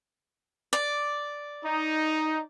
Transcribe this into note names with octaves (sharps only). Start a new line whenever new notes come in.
D5
D#4